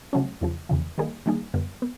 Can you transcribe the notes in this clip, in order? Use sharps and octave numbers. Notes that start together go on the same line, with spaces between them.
C#3 F#3 A3 C#4
E2 C#3 F3
E2 C#3 F3
D#3 G3 A#3 D#4 G#4
D#3 G3 A#3 D#4 G#4
F#2 D3 G3 B3
B3